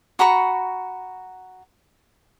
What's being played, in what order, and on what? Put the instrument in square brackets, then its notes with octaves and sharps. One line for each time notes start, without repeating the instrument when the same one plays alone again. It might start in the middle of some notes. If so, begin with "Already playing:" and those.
[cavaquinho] F#4 A#5 B5 C#6